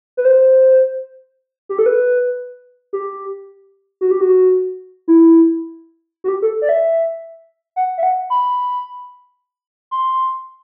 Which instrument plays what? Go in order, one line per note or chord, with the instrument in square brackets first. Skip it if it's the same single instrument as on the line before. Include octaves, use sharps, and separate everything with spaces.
[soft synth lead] B4
C5
G4
A4
B4
G4
F#4
G4
F#4
E4
F#4
G4
A4
D5
E5
F#5
E5
F#5
B5
C6